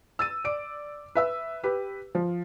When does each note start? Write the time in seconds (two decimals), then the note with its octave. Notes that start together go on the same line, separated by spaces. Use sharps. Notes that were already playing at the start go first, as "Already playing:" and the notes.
0.19 E6 A6 D#7
0.44 D5 D6 D7
1.15 B4 E5 E6
1.63 G4 B4
2.15 F3